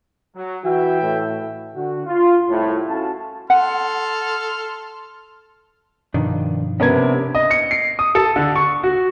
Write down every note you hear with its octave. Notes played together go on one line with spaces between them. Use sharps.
F#3
E3 F#4 E5 G5
A2
D3 F#4
F4
C2 A2
C#4 F#4 A4 F5 A5
A4 F#5 C6 F6
G2 B2 D#3 F3 D4
C3 B3 C#4 D4 A#4 B4 G#6
D#5
C#7
C7
D#6
A4
D3
C#6
F#4